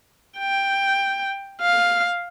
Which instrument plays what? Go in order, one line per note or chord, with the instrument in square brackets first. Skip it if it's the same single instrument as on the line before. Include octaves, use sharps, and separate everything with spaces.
[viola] G5
F5